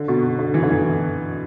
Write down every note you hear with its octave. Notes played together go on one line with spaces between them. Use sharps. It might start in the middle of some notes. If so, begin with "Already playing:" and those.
Already playing: D3
B2
D3
E3
D3
E3